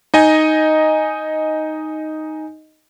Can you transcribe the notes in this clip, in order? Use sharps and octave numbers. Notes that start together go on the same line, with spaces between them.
D#4 D#5 G#5